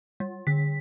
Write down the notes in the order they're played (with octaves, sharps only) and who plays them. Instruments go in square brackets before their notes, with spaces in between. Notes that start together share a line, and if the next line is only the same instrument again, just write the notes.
[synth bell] G3
D3 B6